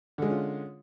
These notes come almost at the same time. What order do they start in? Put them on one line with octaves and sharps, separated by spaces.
D3 G#3 C#4 F4